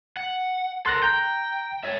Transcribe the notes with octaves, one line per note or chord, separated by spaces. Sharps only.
F#5
A4 A#4 C6 F#6 A#6
G5 A#5 G6
C#5 E5